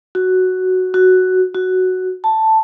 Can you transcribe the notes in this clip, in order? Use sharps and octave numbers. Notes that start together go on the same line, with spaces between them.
F#4
F#4
F#4
A5